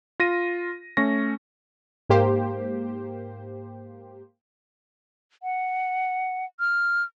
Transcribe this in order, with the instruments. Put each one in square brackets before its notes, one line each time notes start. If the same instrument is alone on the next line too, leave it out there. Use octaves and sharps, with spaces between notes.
[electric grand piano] F4 A#6 D#7
A3 C#4 C#6 A#6
[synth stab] G#2 A#3 G4 C5
[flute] F#5
F6